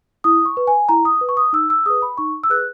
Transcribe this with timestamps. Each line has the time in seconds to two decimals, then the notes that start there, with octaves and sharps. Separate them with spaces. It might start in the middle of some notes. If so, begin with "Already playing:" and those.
0.24 E4 D#6
0.45 C#6
0.57 B4
0.67 G#5
0.89 E4 A#5
1.05 D#6
1.21 B4
1.29 C#6
1.37 D#6
1.53 D#4 E6
1.70 E6
1.86 G#4 B4 D#6
2.02 B5
2.17 D#4 C#6
2.44 E6
2.50 G#4 B4 F#6